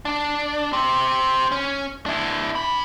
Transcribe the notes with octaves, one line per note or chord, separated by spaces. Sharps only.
D4
C4 G4
C#4
D4 E4
D4 B5